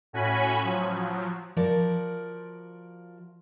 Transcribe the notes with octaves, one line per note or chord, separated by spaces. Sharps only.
A2 C#4 F#4 G#5 B5
F3 F#3
F3 F#4 A#4 D5